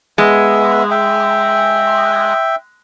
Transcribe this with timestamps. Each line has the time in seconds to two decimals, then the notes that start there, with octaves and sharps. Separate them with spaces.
0.18 G#3 B3 E5
0.91 E5 G5